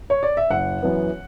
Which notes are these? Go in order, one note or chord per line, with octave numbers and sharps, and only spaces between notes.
C#5
D5
E5
F#1 F#5
F#2 E3 B3